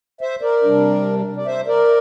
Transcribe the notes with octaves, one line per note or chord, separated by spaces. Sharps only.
C5 E5
A#4 D5
C3 G3 D4
D5
C5 E5
A#4 D5